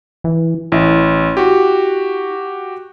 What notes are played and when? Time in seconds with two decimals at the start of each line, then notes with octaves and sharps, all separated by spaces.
0.24 E3
0.72 A1 E4
1.37 F#4 G4